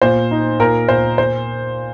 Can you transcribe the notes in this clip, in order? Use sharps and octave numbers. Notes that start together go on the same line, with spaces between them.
A#2 C5
D#4
A#2 A#4
A#2 C5
C5